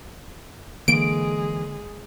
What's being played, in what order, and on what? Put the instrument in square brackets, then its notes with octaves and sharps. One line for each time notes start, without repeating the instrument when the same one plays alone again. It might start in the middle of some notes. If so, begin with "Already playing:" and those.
[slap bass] D3 A#3 [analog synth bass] E3 [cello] G#3 G#4 [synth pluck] D7